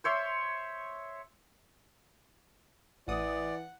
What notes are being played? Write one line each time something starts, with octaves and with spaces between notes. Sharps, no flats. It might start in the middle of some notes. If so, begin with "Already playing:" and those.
C5 C#5 E5 C6
A1 E3 D5 F#5 D#6